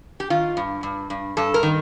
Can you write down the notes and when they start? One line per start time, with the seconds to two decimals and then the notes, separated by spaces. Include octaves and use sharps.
0.20 G4
0.30 D#3 F4
0.57 G2
0.83 G2
1.10 G2
1.37 G2 A4
1.54 A#4
1.63 D#3